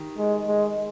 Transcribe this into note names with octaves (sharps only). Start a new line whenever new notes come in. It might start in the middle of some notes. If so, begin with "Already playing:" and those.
Already playing: D#3 G4
G#3
G#3